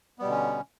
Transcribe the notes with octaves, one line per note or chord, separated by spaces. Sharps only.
B2 D3 G3 B3 C#4